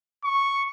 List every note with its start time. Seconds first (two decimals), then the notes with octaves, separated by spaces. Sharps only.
0.24 C#6